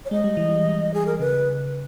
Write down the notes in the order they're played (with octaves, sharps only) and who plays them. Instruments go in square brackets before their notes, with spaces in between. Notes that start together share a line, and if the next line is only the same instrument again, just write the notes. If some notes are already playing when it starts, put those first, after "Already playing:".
[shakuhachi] C#5
[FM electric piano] G#3 [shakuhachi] D#5
[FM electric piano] G3
E3
G3
E3
[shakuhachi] G#4
A#4
[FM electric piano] C#3 [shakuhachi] B4